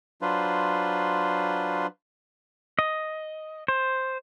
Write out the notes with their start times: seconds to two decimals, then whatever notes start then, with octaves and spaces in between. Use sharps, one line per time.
0.22 F#3 D4 F4 B4 C5
2.79 D#5
3.68 C5